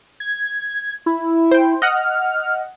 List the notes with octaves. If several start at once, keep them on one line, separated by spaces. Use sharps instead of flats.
G#6
E4
C5 G5
D#5 F#5 F6